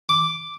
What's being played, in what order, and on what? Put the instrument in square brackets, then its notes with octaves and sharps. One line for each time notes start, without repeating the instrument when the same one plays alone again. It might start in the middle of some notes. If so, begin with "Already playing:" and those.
[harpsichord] D6